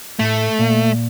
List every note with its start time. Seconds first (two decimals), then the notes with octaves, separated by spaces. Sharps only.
0.19 A2 A3
0.59 A#2